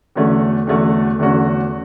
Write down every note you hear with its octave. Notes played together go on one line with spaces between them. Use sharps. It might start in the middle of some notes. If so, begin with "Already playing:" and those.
E2 D3 A3 C#4 F#4
E2 D3 A3 C#4 F#4
E2 D3 A3 C#4 F#4